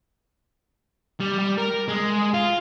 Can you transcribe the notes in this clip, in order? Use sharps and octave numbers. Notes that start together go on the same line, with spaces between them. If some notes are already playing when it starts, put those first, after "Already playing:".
G3
G3
A#4
G#3
F4